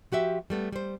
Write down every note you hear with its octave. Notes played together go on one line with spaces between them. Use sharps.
F3 F#4 G4 E5
G3 A3 B3
G3 C5